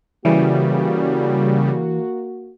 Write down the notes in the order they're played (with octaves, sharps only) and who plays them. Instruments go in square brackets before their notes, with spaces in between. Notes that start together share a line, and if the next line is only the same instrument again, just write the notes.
[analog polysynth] C#3 G3 [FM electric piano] E3 [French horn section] A#3 F#4